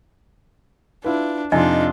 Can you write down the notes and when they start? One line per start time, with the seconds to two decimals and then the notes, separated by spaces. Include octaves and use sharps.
1.04 D4 E4 F4 B4
1.52 F2 C3 D4 D#4 F4 D5 D#5 G#5